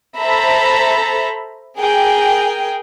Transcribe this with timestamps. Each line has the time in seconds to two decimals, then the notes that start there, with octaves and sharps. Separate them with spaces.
0.19 A4 C5 E5 A#5 B5
1.79 G#4 A#4 G5